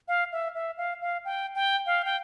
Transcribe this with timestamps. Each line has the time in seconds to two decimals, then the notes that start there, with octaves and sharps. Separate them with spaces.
0.08 F5
0.32 E5
0.55 E5
0.77 F5
1.01 F5
1.25 G5
1.55 G5
1.86 F5
2.05 G5